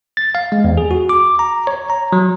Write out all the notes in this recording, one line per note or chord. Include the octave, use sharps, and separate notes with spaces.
A6
F5
G#3
E2
G#4
F#4
D6
A#5
C#5
A#5
F#3